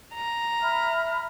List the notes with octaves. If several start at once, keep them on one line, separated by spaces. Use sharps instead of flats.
A#5
E5 B5 F6